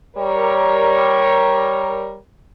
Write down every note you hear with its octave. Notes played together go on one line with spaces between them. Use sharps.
G3 A#4 C#5